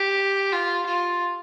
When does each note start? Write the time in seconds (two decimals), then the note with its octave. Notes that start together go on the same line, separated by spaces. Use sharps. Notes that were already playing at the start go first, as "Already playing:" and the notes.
Already playing: G4
0.52 F4
0.86 F4